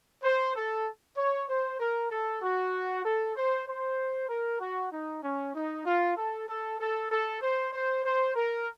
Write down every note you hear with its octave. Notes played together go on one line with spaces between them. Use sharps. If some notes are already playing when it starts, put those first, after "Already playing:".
C5
A4
C#5
C5
A#4
A4
F#4
A4
C5
C5
A#4
F#4
D#4
C#4
D#4
F4
A4
A4
A4
A4
C5
C5
C5
A#4